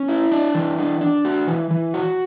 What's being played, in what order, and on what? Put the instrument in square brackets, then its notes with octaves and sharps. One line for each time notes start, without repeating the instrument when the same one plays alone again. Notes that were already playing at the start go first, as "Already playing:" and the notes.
Already playing: [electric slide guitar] C#4
E4
D4
E3
D4
D4
F#4
E3
E3
F#4